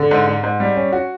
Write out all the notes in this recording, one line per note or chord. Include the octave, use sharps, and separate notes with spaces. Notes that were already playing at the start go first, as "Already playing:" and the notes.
Already playing: D3
G#2
G#2
G#2
G3
C#4
F#4